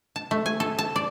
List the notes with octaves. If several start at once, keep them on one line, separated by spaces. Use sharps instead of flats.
A5
A3
G#5
A4
A5
D5